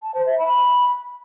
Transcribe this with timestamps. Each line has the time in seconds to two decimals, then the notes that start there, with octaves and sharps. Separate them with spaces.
0.03 A5
0.14 C5
0.26 E5
0.38 B5